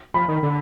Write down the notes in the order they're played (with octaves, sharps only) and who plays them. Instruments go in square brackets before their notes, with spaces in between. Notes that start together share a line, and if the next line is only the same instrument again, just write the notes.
[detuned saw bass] F3 [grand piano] B5
[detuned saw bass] D#3
D3